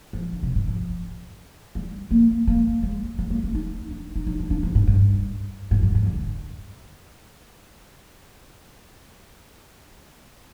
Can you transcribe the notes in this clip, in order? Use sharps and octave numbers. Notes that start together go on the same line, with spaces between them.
F3
D3
C3
G#2
F3
G3
A#3
A#3
G#3
G#3
A#3
C4
D#4
D4
D#4
D#4
D4
D4
F3
G#2
G2
G#2
G2
G#2
D3